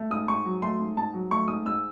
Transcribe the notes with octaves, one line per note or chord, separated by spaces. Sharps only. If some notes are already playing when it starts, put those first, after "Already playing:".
Already playing: A3
G#2 D#6
G#2 C#6
F#3
A3 C6
G#2
G#2 A5
F#3
A3 C#6
G#2 D#6
G#2 E6